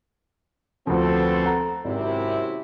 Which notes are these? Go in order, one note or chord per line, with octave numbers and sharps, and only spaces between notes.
D2 F3 B3 C4 A4
F#5 A#5
G#1 F#2 C3 E4